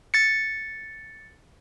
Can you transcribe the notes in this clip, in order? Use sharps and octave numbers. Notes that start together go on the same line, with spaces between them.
A6 C#7